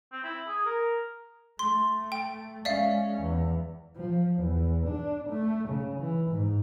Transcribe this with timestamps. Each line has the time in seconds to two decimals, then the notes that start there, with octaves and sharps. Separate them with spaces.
0.12 C4
0.24 E4
0.48 G#4
0.65 A#4
1.59 A3 C6
2.12 G5
2.65 G#3 C#4 D5 E5 F5
3.21 E2
3.96 F3
4.39 E2
4.87 D4
5.29 A3
5.69 C#3
6.00 E3
6.30 G#2